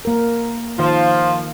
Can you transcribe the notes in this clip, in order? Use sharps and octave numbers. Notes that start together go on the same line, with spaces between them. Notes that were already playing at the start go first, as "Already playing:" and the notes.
A#3 A#4
D#3 F3 F5